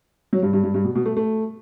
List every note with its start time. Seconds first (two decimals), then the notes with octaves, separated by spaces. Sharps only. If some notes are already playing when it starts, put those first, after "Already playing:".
0.33 F#3
0.42 G2
0.53 G2
0.64 G2
0.74 G2
0.84 B2
0.95 B2
1.06 A3
1.17 A3